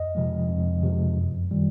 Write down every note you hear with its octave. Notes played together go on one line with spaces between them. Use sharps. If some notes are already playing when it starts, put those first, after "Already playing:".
Already playing: F2 D#5
C3 F3 G#3
F2
C3 F3 G#3
F#2
D#3 G3